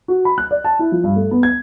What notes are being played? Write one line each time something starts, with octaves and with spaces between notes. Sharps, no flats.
F#4
B5
F#6
D5
A5
E4
F3
G2
A3
B3
G#6